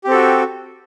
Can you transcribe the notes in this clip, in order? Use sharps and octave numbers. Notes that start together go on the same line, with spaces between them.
C4 F#4 G4 A4